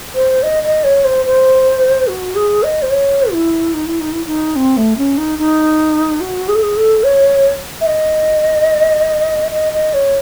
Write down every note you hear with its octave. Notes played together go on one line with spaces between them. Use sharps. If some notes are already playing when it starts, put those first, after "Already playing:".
C5
D#5
D#5
C#5
C5
C5
F#4
G#4
D#5
C5
C#5
E4
D#4
E4
D#4
E4
D#4
C4
A3
C#4
D#4
D#4
F#4
G#4
A4
G#4
A4
C#5
E5
D#5
D#5
D#5
C#5